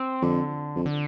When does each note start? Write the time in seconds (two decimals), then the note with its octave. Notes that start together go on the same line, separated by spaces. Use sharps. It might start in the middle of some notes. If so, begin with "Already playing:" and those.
Already playing: C4
0.22 F2 D3
0.76 F2
0.86 D3